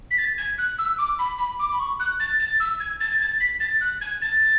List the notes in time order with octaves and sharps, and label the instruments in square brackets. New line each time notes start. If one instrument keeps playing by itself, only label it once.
[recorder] B6
A6
G#6
F#6
E6
D6
B5
B5
D6
B5
C#6
F#6
A6
A6
E6
G#6
A6
G#6
A6
B6
A6
F#6
G#6
A6